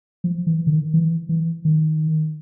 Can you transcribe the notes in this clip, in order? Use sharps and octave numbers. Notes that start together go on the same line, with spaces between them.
F3
E3
D3
D#3
E3
E3
D#3